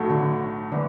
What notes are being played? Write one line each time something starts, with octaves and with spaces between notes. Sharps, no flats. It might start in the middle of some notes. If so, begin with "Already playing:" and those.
Already playing: B1 A2 F#3 A3
D3
A2 D3 E3 B3